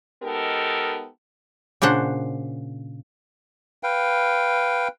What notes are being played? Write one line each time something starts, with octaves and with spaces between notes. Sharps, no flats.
G#3 B3 D#4 G4 A4 A#4
A#2 C#3 D4 C5 F#5
B4 F5 G5